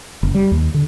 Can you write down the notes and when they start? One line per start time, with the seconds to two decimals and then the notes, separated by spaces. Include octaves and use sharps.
0.23 F#1
0.35 G3
0.51 D#2
0.74 D3